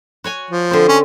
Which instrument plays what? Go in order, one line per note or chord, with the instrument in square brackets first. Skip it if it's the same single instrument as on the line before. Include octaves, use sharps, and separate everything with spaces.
[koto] F#4 C#5 G#5
[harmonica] F3
[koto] D3 C4
[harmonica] C#4